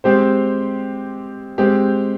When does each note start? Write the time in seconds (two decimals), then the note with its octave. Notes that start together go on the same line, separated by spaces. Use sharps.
0.04 G#3 C4 G4 C5
1.58 G#3 C4 G4